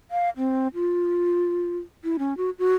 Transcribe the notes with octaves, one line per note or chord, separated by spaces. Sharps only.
F5
C4
F4
E4
C#4
F#4
F#4